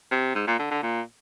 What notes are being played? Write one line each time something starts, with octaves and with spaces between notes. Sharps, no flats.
C3
G#2
A#2
D3
D3
A#2